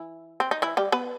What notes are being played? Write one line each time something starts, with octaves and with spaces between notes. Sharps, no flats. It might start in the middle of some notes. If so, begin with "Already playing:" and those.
Already playing: E3 E4
C4
D#4
E3 E4
G3 G4
B3 B4